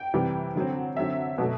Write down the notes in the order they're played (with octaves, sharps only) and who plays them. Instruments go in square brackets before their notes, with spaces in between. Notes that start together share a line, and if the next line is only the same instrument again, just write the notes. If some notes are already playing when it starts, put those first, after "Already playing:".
Already playing: [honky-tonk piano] G5
C3 E3 G3
D3 F#3 C4
D3 F#3 C4 E5
B2 F#3 A3